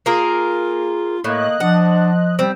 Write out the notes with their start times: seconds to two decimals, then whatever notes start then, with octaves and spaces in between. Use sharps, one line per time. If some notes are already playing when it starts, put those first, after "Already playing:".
0.06 A#3 F4 G#4 A#4
1.24 A2 A#3 D#5 F#6
1.60 F3 D4 F#5
2.39 G3 C4